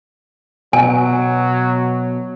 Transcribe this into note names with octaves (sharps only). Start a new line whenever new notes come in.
B2 F#3 G#5